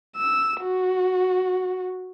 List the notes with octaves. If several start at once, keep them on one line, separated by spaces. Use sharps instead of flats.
E6
F#4